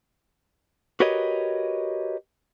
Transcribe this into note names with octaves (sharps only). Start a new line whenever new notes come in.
F#4 G4 A#4 B4 C#5 D#5